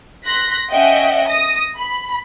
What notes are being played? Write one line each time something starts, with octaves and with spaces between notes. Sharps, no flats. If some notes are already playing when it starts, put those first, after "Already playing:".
C6 F#6 A#6 B6
C#4 D#5 E5 F#5 G5
D#6 A#6
B5